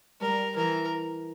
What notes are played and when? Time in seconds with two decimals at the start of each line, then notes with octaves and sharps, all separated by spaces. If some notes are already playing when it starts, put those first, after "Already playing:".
0.21 G3 A#4
0.56 E3 A#4